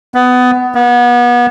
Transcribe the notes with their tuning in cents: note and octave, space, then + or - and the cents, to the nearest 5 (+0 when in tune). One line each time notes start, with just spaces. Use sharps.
B3 +20
B3 -30